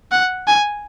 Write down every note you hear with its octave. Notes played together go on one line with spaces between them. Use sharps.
F#5
G#5